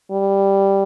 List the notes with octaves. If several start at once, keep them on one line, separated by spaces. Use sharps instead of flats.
G3